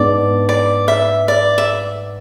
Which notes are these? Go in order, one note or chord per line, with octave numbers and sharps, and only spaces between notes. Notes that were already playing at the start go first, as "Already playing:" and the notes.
Already playing: G#2 G#3 B3 D4 D5
D5
E5
D5
E5